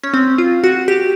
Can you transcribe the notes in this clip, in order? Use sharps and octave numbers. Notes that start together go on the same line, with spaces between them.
C#4
C4
F4
F#4
G4